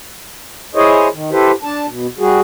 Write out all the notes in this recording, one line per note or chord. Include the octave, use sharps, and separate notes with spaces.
E4 G#4 C5 C#5 D#5
D#3
E4 G4 A4 B4 C5
D4 A5
B2
G3 F#4 G#4